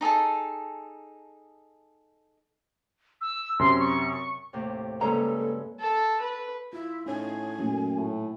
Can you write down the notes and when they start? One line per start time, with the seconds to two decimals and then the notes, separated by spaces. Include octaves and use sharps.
0.01 D#4 G#4 A4 A5
3.21 E6
3.59 F#2 C3 C6
3.79 C#6
4.53 D#2 A2 C3
5.01 G2 C#3 G#3 A#3 A4 B4 A#5
5.80 A4
6.21 B4
6.73 E4 F4
7.06 A2 C#4 D#4 C#5 G#5
7.59 F#2 A#2 A3 A#3
7.95 A2